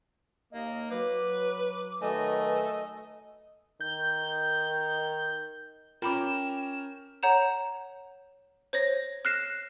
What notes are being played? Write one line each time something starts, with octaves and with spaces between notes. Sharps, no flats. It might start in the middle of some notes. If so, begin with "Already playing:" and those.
D#2 A#3 D#5
F#3 B4 D6
D#3 F#3 A3 B4 D#5 G#5
D#3 G6
C#4 F4 A#4 G5 B5 D6 E7
C#5 F#5 A#5 G6 E7
C5 C#5 A#6
F6 F#6 A#6 C7 E7